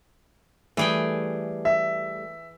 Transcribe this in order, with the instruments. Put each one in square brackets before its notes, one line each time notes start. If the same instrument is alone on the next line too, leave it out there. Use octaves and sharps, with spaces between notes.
[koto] E3 G#4 G5 [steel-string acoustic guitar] G3 A3
[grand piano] E5